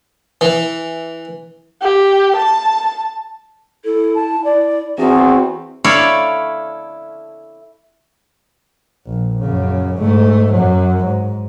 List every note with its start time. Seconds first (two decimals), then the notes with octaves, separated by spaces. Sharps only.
0.41 E3
1.82 G4
2.36 A5
3.85 E4 A4
4.15 A5
4.45 E4 D5
4.98 E2 C4 F#4 G#4
5.84 E4 A4 C#5 D5 F5
9.06 A#1
9.41 F#2 C#3
9.97 G#2 A3
10.52 F#2 F#3
11.04 G#2